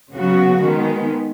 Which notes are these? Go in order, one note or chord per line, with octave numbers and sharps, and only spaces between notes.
C#3 F#3 B3 F#4
D#3 G#3 B3